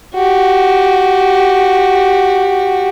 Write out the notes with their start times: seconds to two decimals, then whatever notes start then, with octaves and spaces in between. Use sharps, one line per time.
0.15 F#4 G4